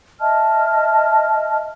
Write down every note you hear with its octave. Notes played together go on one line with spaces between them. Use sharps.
D#5 E5 A5 F6